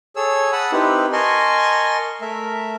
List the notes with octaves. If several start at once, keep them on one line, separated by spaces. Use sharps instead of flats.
G#4 A4 C#5 E6
F#5 A5 B5 D#6 E6
C4 D#4 E4 G4 B4
A#4 D#5 G#5 A5 C6 C#6
A3 A#4 E5